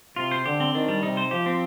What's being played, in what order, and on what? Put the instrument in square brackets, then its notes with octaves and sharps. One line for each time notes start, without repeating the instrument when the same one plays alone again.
[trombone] C3 [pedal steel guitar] F4
[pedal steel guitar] C5
[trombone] D3 [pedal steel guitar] G4
[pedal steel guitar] C4
[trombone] D#3 [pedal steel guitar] D4
[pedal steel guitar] G3
[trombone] C3 [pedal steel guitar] D#4
[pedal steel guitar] C5
[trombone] F3 [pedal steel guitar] G4
[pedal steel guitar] C4